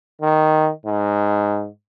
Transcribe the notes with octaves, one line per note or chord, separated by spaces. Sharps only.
D#3
G#2